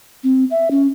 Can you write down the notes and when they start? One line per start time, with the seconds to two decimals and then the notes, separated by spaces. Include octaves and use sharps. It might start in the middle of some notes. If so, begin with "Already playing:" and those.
0.24 C4
0.51 E5
0.71 C#4